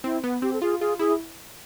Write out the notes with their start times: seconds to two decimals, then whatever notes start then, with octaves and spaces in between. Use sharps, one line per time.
0.04 C4 E4
0.24 B3
0.42 C4 G4
0.53 A4
0.62 F4 G#4
0.80 F4 G#4
0.99 E4 G#4